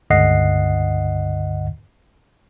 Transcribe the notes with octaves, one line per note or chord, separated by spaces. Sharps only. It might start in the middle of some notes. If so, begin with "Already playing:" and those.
C#2 G2 D3 D#5 F#5 C7